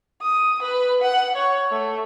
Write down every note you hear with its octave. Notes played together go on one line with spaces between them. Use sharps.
D#6
B4
F#5
C#5
A3